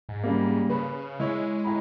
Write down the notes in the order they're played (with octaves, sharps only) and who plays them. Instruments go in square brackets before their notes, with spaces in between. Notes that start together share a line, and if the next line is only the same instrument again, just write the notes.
[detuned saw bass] G#2
[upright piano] C#3 G3 A#3
[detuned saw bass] C#3 [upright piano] B4
[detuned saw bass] G#3 [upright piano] E4 C#5
[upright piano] A2 A#5 B5